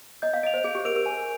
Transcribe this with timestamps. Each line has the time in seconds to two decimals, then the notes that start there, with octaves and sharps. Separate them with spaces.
0.22 D#5 G6
0.34 F5
0.43 D#5 D7 F7
0.54 C5
0.64 G#4 G6
0.75 G4
0.85 A#4 D7 F7
0.96 A#4
1.06 G#5